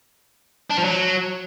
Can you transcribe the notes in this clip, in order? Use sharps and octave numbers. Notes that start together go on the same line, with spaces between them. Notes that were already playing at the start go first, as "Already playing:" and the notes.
D4
F3
F#3